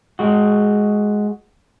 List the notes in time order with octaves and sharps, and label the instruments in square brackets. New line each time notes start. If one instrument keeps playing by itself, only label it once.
[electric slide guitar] G#3 F#4